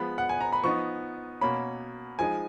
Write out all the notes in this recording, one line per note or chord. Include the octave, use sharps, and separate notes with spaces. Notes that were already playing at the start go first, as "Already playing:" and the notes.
Already playing: F3 G#3 B3 B5
F#5
G#5
A#5
B5
F3 B3 D#4 C#6
B2 A#3 C#4 B5
F3 G#3 D#4 G#5